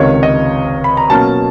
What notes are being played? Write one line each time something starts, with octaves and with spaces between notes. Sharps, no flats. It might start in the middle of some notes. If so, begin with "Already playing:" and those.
Already playing: C#2 C3 D#3 C#5
D#5
B5
A#5
B2 F#3 A#3 C#4 A5